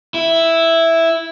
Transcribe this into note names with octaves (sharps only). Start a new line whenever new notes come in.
E4